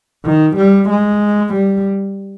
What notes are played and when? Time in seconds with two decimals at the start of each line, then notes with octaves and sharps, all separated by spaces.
0.25 D#3
0.57 G3
0.90 G#3
1.54 G3